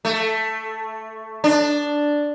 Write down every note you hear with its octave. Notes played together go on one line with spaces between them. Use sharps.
A3
D4